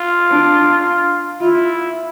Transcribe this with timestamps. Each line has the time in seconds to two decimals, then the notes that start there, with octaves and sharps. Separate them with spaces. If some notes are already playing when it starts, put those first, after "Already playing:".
Already playing: F4
0.31 D4
1.41 E4 F4